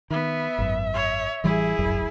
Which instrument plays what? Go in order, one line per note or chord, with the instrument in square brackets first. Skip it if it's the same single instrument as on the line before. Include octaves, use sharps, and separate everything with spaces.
[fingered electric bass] D#3 [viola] B3 [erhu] E5
[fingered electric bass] G#1 F#2
[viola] C#5
[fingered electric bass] A1 E3 G3 [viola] E4 G#4
[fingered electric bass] D1 G1 F#2